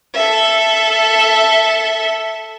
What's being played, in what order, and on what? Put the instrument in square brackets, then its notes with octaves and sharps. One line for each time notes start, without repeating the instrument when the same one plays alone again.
[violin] A4 E5